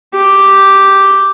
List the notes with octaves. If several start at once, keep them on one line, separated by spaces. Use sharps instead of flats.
G4